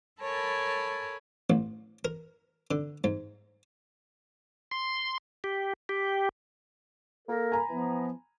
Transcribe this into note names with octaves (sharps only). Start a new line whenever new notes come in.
A4 A#4 C#5 G#5 A5 B5
A1
A#4
D3
G#2
C6
G4
G4
A#3 A4 A#4
G#5 A#5 B5
E3 F3 B3